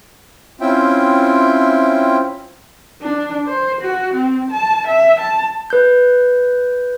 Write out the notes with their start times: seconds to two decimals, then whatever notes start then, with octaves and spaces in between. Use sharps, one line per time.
0.61 C4 C#4 E4 F4 E5 G5
3.02 D4
3.47 C5
3.81 F#4
4.13 C4
4.51 A5
4.87 E5
5.19 A5
5.70 B4 G6